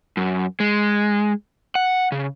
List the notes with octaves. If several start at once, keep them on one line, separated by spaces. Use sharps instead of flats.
F#2
G#3
F#5
C#3